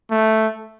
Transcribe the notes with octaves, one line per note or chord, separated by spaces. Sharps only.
A3